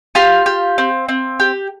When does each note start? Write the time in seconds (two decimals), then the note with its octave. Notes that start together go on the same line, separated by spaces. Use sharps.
0.15 F4 G4 F5
0.46 G4
0.78 C4
1.09 C4
1.40 G4